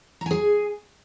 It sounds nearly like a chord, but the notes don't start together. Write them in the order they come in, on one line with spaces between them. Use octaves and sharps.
A#5 G#5 G#4